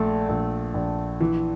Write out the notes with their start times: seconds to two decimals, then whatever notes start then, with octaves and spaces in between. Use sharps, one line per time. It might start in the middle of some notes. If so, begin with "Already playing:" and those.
Already playing: A#1 A3
0.29 A#1
0.74 A#1
1.21 E3